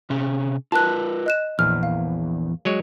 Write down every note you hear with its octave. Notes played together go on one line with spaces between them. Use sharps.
C3 C#4 G#4
F4 A#4 B4 A5 F#6
D#5 F#6 E7
A#1 E2 F6
F5
F#3 G#3 C#5